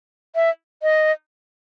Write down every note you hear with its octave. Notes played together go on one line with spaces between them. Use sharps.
E5
D#5